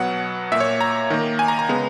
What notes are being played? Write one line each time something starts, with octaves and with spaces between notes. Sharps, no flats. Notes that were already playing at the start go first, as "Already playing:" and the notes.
Already playing: B2 F#3 B3 F#5
A#2 A#3 E5
C#5
A#5
D#3 A#3
G#5
A#5
A#5
C#3 G#3 B3